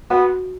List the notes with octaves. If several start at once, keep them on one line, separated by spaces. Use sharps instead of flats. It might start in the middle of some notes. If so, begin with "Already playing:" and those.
B3 F#4